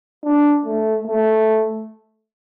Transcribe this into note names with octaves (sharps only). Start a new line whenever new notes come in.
D4
A3
A3